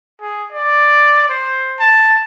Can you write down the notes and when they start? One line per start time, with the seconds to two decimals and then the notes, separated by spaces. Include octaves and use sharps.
0.21 G#4
0.52 D5
1.29 C5
1.79 A5